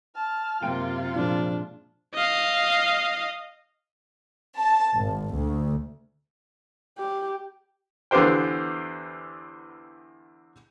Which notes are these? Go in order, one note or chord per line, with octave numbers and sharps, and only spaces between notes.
A5 F6
F#2 C3 A#3 F4 G5 D7
A#2 F3 G#3 D4
D#5 F5
A5
G#1
D2
G4
E2 D3 B3 G4 C5 G5